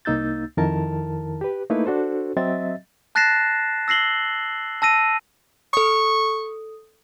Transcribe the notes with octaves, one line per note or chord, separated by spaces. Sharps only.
C2 A#3 D#4 E6 G6 A6
F2 D#3 E4 A#4 A5
G4 B4
A3 A#3 D#4 E4 B4
D4 F#4 A4 C5
F#3 C4 D#5 E5 A6
A5 F#6 A6 A#6 C7 E7
E6 A#6 C7 F#7 G7
A5 E6 A#6 D#7
A4 C#6 D#6